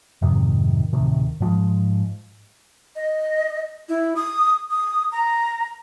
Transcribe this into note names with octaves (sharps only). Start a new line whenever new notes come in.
F2 G#2 C3 D#3
D2 A2 C3 D#3
G#2 F3 G#3
D#5
E4
D#6
D#6
A#5